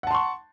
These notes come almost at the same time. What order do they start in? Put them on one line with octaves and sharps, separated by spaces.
F#5 A5 C6 C#6